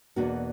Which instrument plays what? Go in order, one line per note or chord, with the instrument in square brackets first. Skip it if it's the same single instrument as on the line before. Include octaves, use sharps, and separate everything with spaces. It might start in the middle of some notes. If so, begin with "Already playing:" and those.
[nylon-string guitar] E2 B2 A#3 D4 F#4